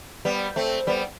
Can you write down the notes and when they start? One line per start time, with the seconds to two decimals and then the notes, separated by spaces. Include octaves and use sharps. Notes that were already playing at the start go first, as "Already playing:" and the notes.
0.25 G3 B3
0.56 A3 C4
0.87 G3 B3